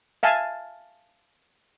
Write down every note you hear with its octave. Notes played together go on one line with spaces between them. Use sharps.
E5 F5 G#5 A5